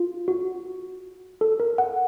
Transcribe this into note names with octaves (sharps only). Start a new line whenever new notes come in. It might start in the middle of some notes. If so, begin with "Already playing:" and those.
Already playing: F4
F#4
A4
A#4
F#5